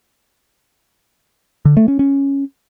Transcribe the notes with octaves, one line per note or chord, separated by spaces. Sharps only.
D3
A3
C#4
C#4